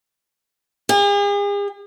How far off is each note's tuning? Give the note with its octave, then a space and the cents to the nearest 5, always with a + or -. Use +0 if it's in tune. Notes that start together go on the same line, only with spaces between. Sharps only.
G#4 -45